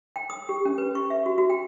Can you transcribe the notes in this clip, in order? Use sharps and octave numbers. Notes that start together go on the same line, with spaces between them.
G5
D#6
G4
C#4
B4
C#6
E5
F#4
F#4
G5